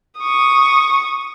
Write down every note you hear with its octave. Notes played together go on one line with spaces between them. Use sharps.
C#6 D#6